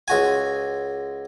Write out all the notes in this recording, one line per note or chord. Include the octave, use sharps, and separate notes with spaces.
C#2 F#4 G#5